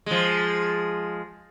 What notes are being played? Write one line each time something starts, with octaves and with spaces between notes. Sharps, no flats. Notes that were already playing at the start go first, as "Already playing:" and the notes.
F3 G#3